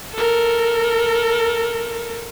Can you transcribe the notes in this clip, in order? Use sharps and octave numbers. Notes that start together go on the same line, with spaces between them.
A4 A#4